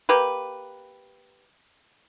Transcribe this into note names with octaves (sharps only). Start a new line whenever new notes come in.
A#3 G4 B4